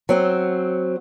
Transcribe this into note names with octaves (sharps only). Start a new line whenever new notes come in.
F#3 C4